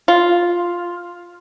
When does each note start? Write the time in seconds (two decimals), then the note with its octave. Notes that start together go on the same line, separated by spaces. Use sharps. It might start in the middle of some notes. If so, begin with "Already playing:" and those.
0.08 F4